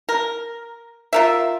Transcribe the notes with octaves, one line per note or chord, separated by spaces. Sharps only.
A#4
F4 A#4 E5